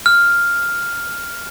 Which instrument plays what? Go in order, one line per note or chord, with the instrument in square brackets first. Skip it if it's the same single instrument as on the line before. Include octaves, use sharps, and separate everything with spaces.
[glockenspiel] F6